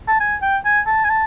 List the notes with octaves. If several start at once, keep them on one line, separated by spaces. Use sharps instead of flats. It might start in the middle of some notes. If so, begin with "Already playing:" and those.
A5
G#5
G5
G#5
A5
G#5
A5